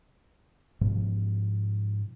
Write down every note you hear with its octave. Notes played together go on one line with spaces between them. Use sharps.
G#2 B2 F3